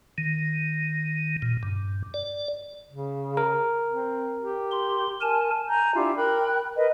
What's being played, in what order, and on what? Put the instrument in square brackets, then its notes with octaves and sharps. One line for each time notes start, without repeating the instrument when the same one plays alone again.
[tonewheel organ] D#3
A#2
G2
D5
[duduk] C#3
[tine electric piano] A#4
[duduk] C4
G4
[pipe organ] C6
A#4 G#5 A5
[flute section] G#5 A#5 G6
D4 E4 F4 G4
A#4 G5 B5 F#6
A#4 B4 D#5